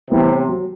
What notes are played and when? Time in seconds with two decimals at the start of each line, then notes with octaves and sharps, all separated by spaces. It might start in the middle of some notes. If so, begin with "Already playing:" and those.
0.10 A2 C3 E3 G3 B3
0.48 F#3